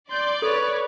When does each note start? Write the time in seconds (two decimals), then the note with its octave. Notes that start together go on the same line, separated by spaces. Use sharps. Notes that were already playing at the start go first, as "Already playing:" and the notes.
0.10 D5 C6 G6
0.42 A4 B4 C#5